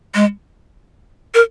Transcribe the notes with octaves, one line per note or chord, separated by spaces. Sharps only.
G#3
A#4